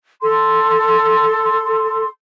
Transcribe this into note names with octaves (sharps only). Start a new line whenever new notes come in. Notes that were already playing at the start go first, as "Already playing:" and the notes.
A4 C6